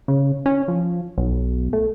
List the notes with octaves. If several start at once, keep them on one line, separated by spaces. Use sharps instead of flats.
C#3
C#4
F3
B1
A3